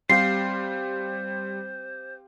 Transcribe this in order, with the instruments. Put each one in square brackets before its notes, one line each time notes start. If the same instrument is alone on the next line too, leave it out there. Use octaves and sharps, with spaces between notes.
[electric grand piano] G3 C6 [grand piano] C4 G4 F5 [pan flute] C5 [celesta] C7